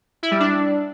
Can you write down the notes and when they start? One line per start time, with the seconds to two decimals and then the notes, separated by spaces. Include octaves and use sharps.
0.23 E4
0.31 G3
0.40 D4